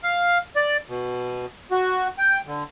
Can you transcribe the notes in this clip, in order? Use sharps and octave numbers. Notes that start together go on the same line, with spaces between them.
F5
D5
B2
F#4
G5
D3